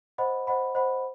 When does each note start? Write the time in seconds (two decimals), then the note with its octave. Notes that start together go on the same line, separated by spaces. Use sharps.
0.18 C5 D#5 F#5 B5
0.47 C5 D#5 F#5 B5
0.75 C5 D#5 F#5 B5